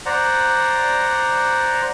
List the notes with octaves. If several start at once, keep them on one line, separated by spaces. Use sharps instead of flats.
C5 D5 F#5 A#5